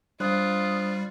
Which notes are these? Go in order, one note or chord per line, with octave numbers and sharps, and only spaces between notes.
G3 D4 F4 C5 D#6 F#6